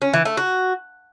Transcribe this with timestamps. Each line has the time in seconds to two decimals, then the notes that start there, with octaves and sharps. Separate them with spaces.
0.02 C#4
0.14 E3
0.25 A3
0.37 F#4